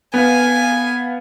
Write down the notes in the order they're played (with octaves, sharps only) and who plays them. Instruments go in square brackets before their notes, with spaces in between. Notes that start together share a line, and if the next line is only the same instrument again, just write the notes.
[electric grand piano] B3 B4 F5 [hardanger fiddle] G#5